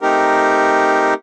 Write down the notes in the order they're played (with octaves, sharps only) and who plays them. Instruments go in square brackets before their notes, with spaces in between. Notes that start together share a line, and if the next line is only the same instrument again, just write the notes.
[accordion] A3 C4 D#4 G4 A#4